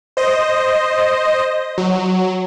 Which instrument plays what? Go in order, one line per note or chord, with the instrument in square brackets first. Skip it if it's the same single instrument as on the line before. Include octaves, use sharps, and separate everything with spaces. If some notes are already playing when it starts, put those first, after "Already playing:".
[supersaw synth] C5 D#5
F#3